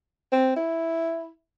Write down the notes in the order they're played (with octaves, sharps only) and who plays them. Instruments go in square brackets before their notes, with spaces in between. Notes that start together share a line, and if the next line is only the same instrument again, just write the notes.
[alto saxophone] C4
E4